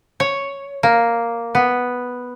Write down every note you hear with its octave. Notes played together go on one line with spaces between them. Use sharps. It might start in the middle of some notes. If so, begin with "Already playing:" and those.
C#5
A#3
B3